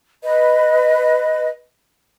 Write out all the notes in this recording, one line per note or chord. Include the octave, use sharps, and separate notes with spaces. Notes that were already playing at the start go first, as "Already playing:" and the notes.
B4 D#5